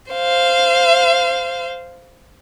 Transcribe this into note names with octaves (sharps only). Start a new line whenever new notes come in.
C5 F5